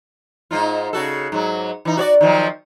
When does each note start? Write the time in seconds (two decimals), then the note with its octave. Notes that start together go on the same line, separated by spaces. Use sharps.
0.51 G#2 D#4 F4
0.93 C#3 F#4 A4
1.32 G#2 F#3
1.85 E3 D#4
1.97 F#4 C#5 D5
2.21 D#3 F3 F#3